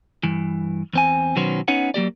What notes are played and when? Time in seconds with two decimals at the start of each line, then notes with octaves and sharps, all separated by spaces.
0.23 G2 E3
0.93 E2 C4 G#5
1.36 B1 D#3 F#3 B3 C#4 C5
1.68 B3 C#4 D#4 C#5 F#5
1.94 F#3 A#3 G4 D5